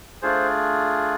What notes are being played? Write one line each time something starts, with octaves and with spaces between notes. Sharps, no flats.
A3 D4 F4 G#4 C5